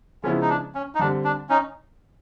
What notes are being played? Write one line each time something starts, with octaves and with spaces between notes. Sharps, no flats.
C#3 F3 G#3 B3 C#4 E4
D#4
D4
C#4
D#4
D3 G3 C4 D4
D4
C#4 D#4